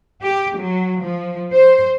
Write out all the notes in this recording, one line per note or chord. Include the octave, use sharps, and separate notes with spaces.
G4
F#3
F3
C5